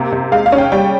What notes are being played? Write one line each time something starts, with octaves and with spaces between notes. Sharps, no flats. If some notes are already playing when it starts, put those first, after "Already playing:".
Already playing: C3 A#3
C3
G#3 F5
F5
C#4
G5
G3 G5